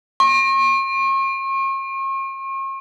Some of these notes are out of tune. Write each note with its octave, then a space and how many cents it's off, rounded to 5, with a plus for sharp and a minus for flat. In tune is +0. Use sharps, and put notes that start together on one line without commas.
C#6 -45